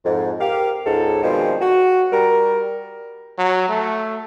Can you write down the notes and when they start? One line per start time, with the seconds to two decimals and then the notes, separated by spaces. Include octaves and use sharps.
0.05 F2 G#2
0.40 G4 A#4 F5
0.85 C#2 G#2 A4
1.22 B2 D#3 F3 G3 G#3 C4
1.61 F#4
2.12 G3 A#4
3.39 F#3
3.69 A3